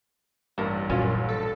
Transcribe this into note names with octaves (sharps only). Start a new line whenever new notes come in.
A1 G2 A#3 A#4
F#2 A#2 C#4 F4
A4